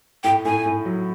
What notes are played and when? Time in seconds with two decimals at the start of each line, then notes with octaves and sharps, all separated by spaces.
0.24 A2 G5
0.45 A2 G#5
0.66 A2
0.86 F#3